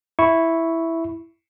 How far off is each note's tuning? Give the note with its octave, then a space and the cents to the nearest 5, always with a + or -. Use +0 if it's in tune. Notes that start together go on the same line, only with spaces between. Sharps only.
E4 +0 C#6 +0